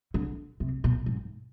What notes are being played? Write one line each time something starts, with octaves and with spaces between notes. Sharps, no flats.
D3
C3
B2
G#2